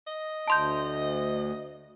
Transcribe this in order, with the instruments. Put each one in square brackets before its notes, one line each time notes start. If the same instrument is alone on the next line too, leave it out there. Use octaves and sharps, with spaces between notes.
[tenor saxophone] D#5
[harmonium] D2 [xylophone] A5 C6 G6